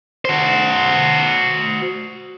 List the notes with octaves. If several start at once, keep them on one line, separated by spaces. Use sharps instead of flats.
F#4 C5